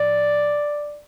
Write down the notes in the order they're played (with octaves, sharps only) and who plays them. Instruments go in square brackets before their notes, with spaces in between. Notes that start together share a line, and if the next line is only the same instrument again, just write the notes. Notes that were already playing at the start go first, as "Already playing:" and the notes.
Already playing: [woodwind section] A2 F3 D5